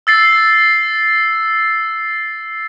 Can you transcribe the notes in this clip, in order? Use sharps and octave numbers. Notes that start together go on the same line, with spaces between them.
E6 A6 C7